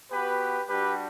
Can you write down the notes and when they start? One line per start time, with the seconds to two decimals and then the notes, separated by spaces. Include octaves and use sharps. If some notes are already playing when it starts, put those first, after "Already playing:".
0.11 B3 F#4 G4 B4
0.69 G3 D4 F#4 G4 B4